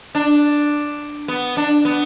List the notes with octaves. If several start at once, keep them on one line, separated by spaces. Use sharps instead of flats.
D4
B3
D4
B3